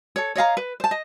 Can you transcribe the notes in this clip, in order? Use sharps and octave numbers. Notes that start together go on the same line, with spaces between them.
A4 C#5
C#5 D#5 F5 A#5
B4
C5 A5
D#5